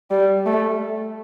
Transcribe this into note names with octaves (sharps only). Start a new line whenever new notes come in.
G3
A3